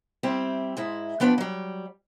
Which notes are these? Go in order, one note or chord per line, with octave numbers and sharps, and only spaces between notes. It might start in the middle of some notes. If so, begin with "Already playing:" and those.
G3 C4 E4 G4
G#2 G#3 E4
F3 B3 D4 B4 E5 G5
F#3 G3